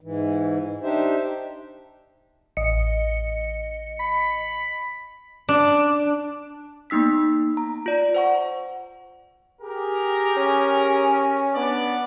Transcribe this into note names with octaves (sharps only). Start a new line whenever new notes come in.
G#2 E3
D4 D#4 G4 C5 E5
A1 D#5 C#7
B5
D4
A#3 B3 D#4 E6 B6
A#5
F4 D5
C5 F#5 C#6
G4 G#4 A#4
C#4
B3 D4 D5